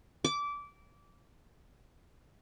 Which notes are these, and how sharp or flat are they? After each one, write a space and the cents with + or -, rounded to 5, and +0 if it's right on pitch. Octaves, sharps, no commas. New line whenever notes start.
D6 -20